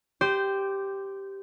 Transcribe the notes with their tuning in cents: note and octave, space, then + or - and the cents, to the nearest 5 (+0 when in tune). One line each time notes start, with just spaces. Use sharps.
G4 +0 C5 -15